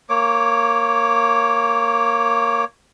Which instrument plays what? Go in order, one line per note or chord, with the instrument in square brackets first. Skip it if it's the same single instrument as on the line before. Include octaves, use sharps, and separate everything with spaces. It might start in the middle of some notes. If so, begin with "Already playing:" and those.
[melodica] A#3 C#5 D6